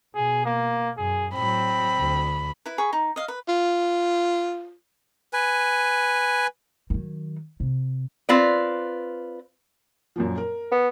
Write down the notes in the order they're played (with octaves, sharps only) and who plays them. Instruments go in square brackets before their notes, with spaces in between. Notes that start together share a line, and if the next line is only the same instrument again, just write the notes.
[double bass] B2 [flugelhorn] G#4
[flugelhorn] A#3
[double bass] F#2 [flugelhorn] G#4
[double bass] A2 F#3 [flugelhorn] C4 [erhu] B5
[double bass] D2
[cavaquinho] E4 B4
G#4 B5 C#6
D#4
D#5 F5
B4
[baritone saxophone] F4
[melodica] B4 G#5
[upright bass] D#3 F#3
C3
[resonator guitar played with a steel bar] C4 F4 B4 D5
[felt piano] F#2 A#2 F3
A#4
[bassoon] B3